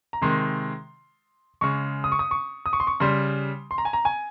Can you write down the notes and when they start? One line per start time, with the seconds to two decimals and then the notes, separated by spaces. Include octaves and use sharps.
0.13 A#5
0.22 C3 D#3 G#3 C6
1.61 C#3 G#3 C#6
2.04 D#6
2.12 C#6
2.19 D#6
2.31 C#6
2.66 D#6
2.73 C#6
2.80 C6
2.87 C#6
3.00 C#3 G3 C6
3.71 C6
3.78 A#5
3.85 G#5
3.93 A#5
4.05 G#5